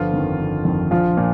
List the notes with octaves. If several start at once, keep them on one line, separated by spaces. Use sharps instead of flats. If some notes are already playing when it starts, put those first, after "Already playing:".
Already playing: G1 F3 F4
F2 D#3
G1
F2 D#3
A#1 F3 F4
A#2